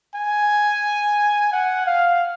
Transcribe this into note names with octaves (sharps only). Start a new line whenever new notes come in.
G#5
F#5
F5